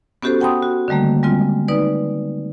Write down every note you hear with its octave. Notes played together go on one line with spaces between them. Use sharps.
B3 C#4 F#4 G4 A4 C5
F#5 G5 A5 B5 C6 D#6
F#4
D3 D#3 G3 A3 A#3
G3 G#3 C4 F4
D#4 B4 D5